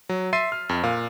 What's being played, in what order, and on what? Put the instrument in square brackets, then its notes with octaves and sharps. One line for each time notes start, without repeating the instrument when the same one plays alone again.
[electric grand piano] F#3
E5 C6 A6 C7 D#7
F6
F2
A#2 F5